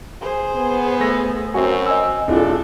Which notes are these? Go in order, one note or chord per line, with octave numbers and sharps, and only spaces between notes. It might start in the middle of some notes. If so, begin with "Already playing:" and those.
G#4 C5
B3
A3 A#6
F#2 C4 F#4 G#5
D#5 G#5 E6
D#1 C4 D4 E4 F4 G#4 A4